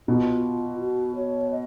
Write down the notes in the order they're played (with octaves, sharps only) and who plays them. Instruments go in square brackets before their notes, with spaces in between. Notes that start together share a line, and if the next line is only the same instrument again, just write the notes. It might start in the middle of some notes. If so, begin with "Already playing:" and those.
[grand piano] B2 [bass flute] F4
[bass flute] F#4
C#5
D#5